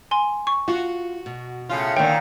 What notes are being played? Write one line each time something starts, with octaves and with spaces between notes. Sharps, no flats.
G#5 C6
C#6
F4 F#4
B2
A2 C#3 F4
A#2 D3 D#3 A#3 C#5 G5